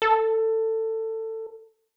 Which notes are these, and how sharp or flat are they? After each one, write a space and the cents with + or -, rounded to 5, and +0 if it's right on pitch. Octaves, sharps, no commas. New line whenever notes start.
A4 +20